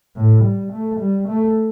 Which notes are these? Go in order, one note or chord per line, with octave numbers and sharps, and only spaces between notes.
A2
G3
A3
G3
A3